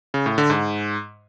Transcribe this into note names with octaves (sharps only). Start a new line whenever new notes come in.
C#3
A2
D3
G#2